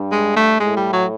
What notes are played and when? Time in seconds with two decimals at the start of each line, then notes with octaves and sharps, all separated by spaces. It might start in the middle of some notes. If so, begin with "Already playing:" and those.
Already playing: G2
0.12 G#3
0.36 A3
0.60 A2 G#3
0.77 G3
0.93 F#3